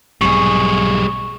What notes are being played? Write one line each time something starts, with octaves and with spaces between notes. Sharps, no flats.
B1 G#2 C3 G3 G#4 C#6